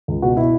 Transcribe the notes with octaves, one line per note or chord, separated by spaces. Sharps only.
C#2
B2 F#4
B2 E4